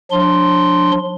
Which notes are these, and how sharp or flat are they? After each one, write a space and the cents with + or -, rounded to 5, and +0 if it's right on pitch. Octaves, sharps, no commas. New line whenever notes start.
F3 +45 D4 +0 C6 +0